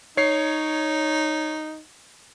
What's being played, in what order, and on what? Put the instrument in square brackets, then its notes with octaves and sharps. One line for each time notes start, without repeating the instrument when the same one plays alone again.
[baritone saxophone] D#4 [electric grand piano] C#5 C7